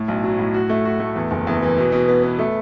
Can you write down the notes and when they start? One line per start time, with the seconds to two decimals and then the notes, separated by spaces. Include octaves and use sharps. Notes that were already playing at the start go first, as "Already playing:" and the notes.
Already playing: A2
0.08 B1
0.24 F#3
0.39 A2
0.54 F#4
0.69 A3
0.85 F#4
1.00 A3
1.16 E2
1.31 F#1
1.47 E2
1.62 E3
1.78 B2
1.92 B2
2.08 B3
2.23 B3
2.39 A3